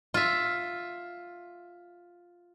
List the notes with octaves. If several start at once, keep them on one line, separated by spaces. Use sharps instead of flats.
F4 E5